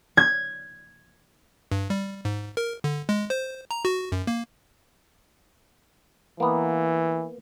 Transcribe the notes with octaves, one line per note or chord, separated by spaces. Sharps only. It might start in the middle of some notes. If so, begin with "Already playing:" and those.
G#6
G2
G3
G#2
A#4
D3
G#3
C5
A#5
F#4
F#2
A#3
E3 A#3 B3